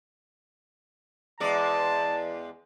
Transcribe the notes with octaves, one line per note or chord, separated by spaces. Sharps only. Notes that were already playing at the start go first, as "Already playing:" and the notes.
E2 G#3 D5 A5